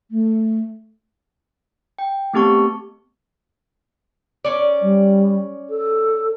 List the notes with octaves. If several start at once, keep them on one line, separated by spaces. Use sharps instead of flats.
A3
G5
A3 B3 C4 G4 A5 C#6
C#4 D5
G3
A4